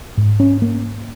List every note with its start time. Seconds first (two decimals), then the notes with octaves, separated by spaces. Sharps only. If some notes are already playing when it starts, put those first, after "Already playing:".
0.17 G#2
0.40 C#4
0.62 A#3